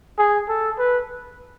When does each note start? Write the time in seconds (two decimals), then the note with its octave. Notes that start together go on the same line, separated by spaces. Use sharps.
0.18 G#4
0.49 A4
0.79 B4